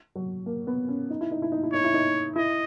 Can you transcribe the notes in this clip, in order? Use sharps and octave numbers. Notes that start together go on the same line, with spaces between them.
F#3
A#3
B3
C#4
D#4
E4
D#4
E4
D#4
E4
D#4 C#5
E4
D#4
E4 D#5